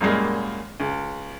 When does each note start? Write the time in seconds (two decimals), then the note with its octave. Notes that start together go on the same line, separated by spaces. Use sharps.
0.01 F#2 A#2 G3 G#3 A#3
0.80 C#2